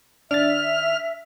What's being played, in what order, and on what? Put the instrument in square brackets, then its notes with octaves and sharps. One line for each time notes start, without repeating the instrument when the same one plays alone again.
[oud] D#3 D5 [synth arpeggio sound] D4 A6 [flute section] E5 [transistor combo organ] F6